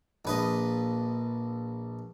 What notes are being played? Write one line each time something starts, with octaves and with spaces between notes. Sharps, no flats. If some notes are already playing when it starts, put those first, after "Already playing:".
A#1 B4 D#5